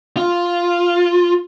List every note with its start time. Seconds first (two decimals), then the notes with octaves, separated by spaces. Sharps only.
0.17 F4